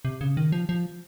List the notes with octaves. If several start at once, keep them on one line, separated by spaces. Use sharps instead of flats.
C3
C#3
D#3
F3
F3